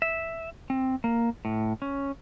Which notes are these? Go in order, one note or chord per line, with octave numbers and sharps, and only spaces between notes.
E5
C4
A#3
A2
C#4